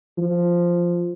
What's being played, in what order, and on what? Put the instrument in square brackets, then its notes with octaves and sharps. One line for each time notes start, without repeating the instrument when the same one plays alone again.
[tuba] F3